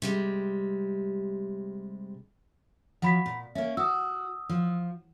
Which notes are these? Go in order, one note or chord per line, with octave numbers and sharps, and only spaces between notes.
C3 G3 G#3
F3 F#3 F#5 B5 B6
A#2
A#3 C#4 E5
F#4 D#6 E6
F3